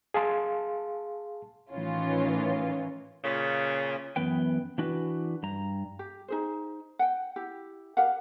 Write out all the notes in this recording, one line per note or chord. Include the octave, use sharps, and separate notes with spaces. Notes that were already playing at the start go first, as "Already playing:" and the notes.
G#4 F5 A5 C6
A2 D#3 E3 C#4 F4
A#2 C#3
F#2 E3 B3 B4 G5
E3 D4 F#4 B4
G2 A#5
G4
D#4 G#4 C5
F#5 G5
E4 G4
G4 A#4 F5 F#5